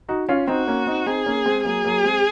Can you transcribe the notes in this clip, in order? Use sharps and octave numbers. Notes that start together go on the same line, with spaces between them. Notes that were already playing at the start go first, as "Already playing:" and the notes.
D#4 F#4
C#4 F4
C4 D#4 F#4
A#3 C#4
C4 D#4
C4 D#4 G#4
A#3 C#4
G#3 C4
F#3 A#3 G#4
F#3 A#3
G#3 C4